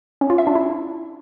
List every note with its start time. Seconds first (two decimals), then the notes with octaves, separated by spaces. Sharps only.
0.21 C#4
0.30 F4
0.38 E5
0.47 D4
0.55 E4